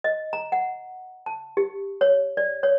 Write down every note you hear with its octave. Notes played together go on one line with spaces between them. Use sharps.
D#5
A#5
F#5
A5
G4
C#5
D5
C#5